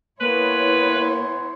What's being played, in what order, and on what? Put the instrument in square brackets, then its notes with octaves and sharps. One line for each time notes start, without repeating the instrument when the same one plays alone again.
[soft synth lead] A#3 [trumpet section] B3 G#5 C6 [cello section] E4 C#5 [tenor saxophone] B4